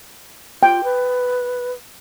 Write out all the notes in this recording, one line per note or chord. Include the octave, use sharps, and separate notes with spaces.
F4 G5
B4